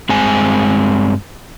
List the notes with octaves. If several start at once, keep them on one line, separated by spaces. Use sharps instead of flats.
G2 G#3 C4 G#5